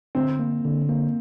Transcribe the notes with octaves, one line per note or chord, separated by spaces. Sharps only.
D3 C4
A#3
D3
A#3